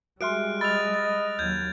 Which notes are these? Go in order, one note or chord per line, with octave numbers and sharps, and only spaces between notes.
G3 G#3 F#4 E5 C6 F6 F#6 D7
D#5 B5 E6 F6 A6 F7
A6
D#2 F#3 G6 G#6